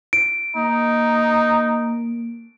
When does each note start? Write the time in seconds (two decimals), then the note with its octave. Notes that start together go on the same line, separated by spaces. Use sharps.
0.13 D7
0.56 A#3 D#4